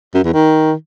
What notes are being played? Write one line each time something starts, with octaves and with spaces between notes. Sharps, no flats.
F#2
E2
D#3